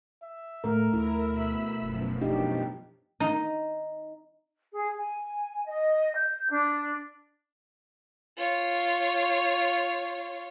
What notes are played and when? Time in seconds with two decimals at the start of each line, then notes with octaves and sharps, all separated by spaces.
0.23 E5
0.64 A2 A3 A#4
0.93 D2 E4 A#4
1.29 B2 B5 E6
1.82 F1 F#2 B2 F3
2.22 D4 D#4 G4
3.20 D#4
4.75 G#4
4.98 G#5
5.67 D#5
6.15 G6
6.51 D4
8.37 F4 C#5